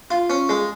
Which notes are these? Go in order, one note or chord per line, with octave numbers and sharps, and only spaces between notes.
F4
C#4
G#3